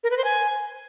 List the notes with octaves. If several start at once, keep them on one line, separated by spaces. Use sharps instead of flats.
A#4
B4
C5
G#5